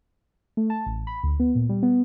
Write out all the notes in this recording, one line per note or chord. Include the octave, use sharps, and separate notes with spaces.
A3
A5
A1
B5
D2
B3
A#2
G3
B3